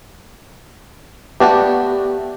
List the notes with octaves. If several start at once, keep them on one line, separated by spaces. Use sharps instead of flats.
A3 B3 D4 F#4 G4